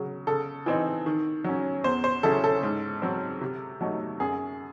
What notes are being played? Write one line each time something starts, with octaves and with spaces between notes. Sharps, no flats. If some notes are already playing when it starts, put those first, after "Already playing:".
Already playing: C#3 F#3
C#3 A4
E3 C4 D#4
D#3
F#3 C#4
E2 C5
C5
C#3 F#3 C#4 E4 A4
A4
G#2
F#3 C4
C3
F#3 A3 D#4
F#2 G#4